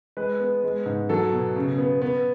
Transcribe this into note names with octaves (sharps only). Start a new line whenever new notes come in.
G#3 B4
B3
G#3
G#2
F#3 A4
B2
C#3
B3
B3